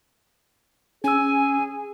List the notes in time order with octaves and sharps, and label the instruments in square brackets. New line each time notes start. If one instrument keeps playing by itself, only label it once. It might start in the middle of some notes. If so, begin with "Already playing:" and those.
[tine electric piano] C#4 E6 [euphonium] G#4 [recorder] G#5